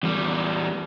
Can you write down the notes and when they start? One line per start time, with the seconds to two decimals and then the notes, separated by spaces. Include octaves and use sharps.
0.03 E2 G3